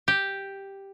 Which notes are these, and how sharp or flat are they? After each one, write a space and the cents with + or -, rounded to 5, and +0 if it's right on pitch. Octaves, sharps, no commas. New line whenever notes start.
G4 +0